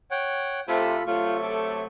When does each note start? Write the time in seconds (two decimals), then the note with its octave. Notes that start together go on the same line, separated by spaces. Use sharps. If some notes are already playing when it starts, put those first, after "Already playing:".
0.11 C#5 F#5 G5
0.68 C3 A3 F4 A4 B5
1.07 C3 F#3 A3 F4
1.43 A4 D6